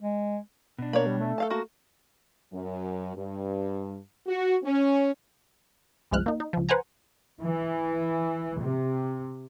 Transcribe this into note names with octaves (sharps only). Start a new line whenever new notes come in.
G#3
B2 D4
A#3 C#5 D5 B5
G3
A3
A4 F5 A5
A#3 F#4
F#2
G2
F#4
C#4
G1 C2 F3 G#3 F6 F#6
A#3 D#4
D#4
C#2 F3
B4 C5 F#5 G#5 A#5
E3
C3